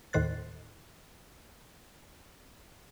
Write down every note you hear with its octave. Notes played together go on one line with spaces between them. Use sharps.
D#2 A2 D#3 C5 F#6 A6